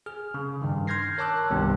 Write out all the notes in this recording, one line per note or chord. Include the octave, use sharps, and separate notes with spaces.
G#4 F6
C#3
G2 D#3
C6 F6 G6 G#6 A#6 C7
A#4 C#5 A5 D6 E6 F#6
C2 G2 C3 D#3 B3